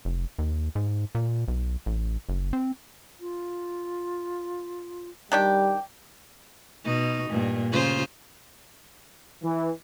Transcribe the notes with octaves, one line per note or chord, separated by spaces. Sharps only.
F1
D#2
G#2
A#2
B1
A1
F#1
C4
F4
D#3 G3 D4 G4 G5
B2 D#4
G2 A#2
C#3 F4 C5
E3